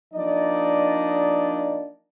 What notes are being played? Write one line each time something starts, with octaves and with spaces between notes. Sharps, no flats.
F3 A#3 D4 D#4 D5 D#5